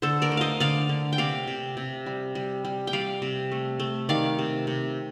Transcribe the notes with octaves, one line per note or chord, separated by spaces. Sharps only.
D3 A4 C5
A#4 D5
A3
C5 D#5 F5
D3 D5 F5
D3
G5
C3 D5 F5
C3
C3
G3
G3
G3
G5
G3 D5 F5
C3
A3
A3
D#3 D5 F5
C3
C3